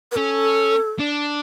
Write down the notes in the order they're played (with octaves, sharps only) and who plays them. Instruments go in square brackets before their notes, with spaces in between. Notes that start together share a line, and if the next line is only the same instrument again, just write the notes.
[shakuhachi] B4
[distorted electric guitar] C#4 [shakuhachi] A4
[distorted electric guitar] D4